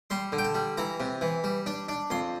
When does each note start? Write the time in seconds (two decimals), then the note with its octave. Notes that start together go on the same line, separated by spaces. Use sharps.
0.10 G3 C6
0.32 D3
0.38 G5
0.44 A5
0.55 G3
0.77 E3 A#5
1.00 C3
1.21 E3
1.44 G3
1.66 D4
1.89 D4
2.10 F2 C6